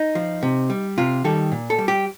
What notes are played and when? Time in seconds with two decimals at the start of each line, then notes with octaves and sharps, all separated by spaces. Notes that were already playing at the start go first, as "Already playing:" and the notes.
Already playing: D#4
0.15 F3
0.43 C3
0.70 G3
0.98 C3 F4
1.24 D#3 G3 A4
1.52 A#2
1.70 A4
1.78 G3
1.88 G4